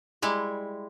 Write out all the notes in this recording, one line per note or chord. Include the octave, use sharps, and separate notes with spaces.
G3 G#3 E4